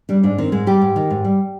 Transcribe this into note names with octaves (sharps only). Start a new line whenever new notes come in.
G3 D4
G#2 D4
D#3 C4
G#2 G#3
G3 G4
G#2
D#3
G#2
G3